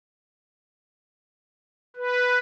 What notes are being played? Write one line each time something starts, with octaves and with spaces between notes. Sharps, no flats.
B4